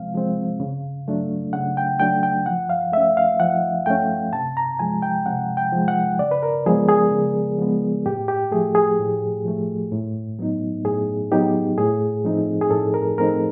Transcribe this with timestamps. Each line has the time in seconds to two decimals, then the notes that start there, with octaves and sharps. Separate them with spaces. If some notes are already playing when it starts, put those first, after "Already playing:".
Already playing: C3 F3 G#3 C4 F5
0.14 F3 G#3 C4
0.60 C#3
1.08 F#3 A3 D4
1.53 C#3 F#5
1.77 G5
2.00 F#3 A3 D4 G5
2.23 G5
2.46 F3 F#5
2.70 F5
2.93 A3 C#4 E5
3.17 F5
3.40 F3 F#5
3.86 A3 C#4 G5
4.33 C3 A5
4.57 A#5
4.79 F3 G#3 G#5
5.03 G5
5.26 C3 F#5
5.57 G5
5.72 F3 G#3
5.88 F#5
6.19 C#3 D5
6.31 B4
6.43 A#4
6.66 F3 G#3 B3 G#4
6.88 G#4
7.12 C#3
7.58 F3 G#3 B3
8.06 A2 G4
8.28 G4
8.51 F3 A3 G#4
8.75 G#4
8.99 A2
9.45 F3 A3
9.92 A2
10.39 F#3 B3 D#4
10.85 A2 G#4
11.32 F#3 B3 D#4 G4
11.78 A2 G#4
12.25 F3 A3 C4 D#4
12.61 G#4
12.71 A2 A4
12.94 A#4
13.18 F3 A3 C4 D#4 A#4